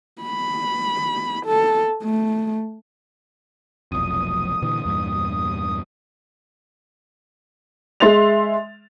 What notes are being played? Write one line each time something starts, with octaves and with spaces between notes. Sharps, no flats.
B5
A4
A3
F1 B1 F2 D#6
A#2 D3 E3
E2 G2 A#2
G#3 E5 C6 A6 F7